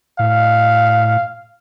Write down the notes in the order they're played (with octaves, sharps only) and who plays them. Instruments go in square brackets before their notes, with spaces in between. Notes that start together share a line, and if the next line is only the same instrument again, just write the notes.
[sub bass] A2 [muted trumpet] F5